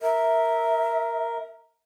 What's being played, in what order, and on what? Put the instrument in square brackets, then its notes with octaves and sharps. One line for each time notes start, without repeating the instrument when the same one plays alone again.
[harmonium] A#4 [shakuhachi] E5